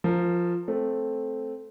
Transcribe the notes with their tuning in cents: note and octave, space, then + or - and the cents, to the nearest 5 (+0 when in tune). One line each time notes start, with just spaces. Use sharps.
F3 +0 A#4 -20
A3 -5 C4 +0